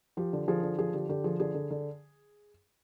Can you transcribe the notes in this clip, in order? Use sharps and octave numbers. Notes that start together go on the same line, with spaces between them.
F3 G4
D3
F3 G#4
D3
F3 G#4
D3 G4
D3 G4
F3 G#4
D3 G#4
D3
D3